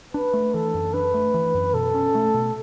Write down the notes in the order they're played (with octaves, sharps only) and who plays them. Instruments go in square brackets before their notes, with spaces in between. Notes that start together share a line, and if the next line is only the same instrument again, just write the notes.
[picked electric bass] D4 [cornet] B4
[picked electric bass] A3
[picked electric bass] E3 [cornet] A4
[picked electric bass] F#2
[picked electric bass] D4 [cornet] B4
[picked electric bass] A3
E3
F#2
[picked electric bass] B2 [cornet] A4
[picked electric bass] C#4
A3
B2